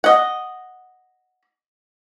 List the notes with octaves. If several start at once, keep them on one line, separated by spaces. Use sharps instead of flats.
D#5 F#5